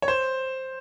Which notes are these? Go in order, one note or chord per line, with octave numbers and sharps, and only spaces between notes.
C#5
C5